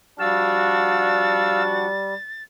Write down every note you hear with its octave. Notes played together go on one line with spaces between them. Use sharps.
F3 G3 D4 F#4 F5 E6 A6